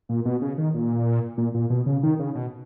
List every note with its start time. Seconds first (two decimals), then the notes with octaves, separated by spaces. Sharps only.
0.09 A#2
0.25 B2
0.42 C#3
0.58 D#3
0.74 A#2
1.38 A#2
1.54 A#2
1.70 B2
1.86 C#3
2.03 D#3
2.19 C#3
2.35 B2